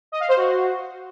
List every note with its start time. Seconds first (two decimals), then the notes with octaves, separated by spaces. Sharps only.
0.12 D#5
0.20 F5
0.29 C5
0.37 F#4